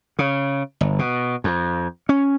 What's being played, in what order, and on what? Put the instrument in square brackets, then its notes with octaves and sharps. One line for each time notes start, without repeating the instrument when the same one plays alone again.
[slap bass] C#3
G1
B2
F2
C#4